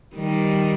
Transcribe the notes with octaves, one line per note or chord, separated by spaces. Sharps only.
D#3 G3